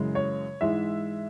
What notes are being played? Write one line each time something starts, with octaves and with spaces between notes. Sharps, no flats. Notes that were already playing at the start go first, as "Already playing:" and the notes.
Already playing: F#2 C#3 E3 G#3
C#5
G#2 E3 G#3 E5